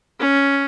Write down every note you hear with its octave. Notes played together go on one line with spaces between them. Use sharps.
C#4